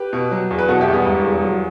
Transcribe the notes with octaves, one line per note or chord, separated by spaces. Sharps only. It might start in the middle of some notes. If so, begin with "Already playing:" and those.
Already playing: G4 B4
B2
F#3
E2
B4
B2 F#4 A4
E4 G4
E2
G3 B3
E1
E2
F#3